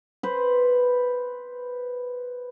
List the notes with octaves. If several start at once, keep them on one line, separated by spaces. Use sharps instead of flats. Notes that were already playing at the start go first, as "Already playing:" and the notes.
B4 C5